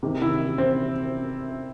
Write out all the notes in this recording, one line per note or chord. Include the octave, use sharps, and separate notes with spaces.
C3 D#3
E4
C4